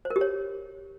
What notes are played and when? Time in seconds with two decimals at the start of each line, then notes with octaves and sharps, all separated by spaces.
0.05 C5
0.10 A#4
0.16 G4
0.21 C#5